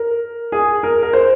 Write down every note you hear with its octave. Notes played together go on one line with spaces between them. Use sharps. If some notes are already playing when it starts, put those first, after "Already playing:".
Already playing: A#4
G#4
A#4
A#4
C5